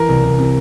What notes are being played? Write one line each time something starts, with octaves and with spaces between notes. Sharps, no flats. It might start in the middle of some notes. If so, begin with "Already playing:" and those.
Already playing: E3 A#4
C2
C2
C3